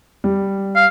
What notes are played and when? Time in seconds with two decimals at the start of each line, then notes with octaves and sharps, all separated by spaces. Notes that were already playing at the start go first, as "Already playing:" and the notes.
0.24 G3
0.76 F5